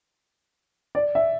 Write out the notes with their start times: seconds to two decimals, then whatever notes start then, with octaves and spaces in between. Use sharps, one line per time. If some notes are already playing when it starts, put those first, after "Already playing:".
0.95 D5
1.15 E5